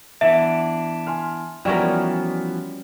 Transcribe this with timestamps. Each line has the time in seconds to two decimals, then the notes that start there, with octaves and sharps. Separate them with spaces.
0.21 E3 B3 D4 E5
1.07 G#5 C6 F6
1.65 E3 F3 G3 B3 C#4 F#4 A#4 D5